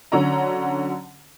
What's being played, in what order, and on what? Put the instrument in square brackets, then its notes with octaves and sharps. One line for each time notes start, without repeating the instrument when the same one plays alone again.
[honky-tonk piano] D3 F#3 C#4 A#5